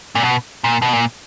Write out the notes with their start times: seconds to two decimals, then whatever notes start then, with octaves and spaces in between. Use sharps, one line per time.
0.15 A#2
0.23 B2
0.64 A#2
0.82 B2
0.93 A#2